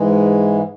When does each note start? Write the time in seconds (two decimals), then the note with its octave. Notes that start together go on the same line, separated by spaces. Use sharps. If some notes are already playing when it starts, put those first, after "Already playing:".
Already playing: G#2 E3 G#3